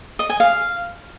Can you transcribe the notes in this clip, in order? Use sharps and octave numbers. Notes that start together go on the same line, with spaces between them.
D#5
G#5
F5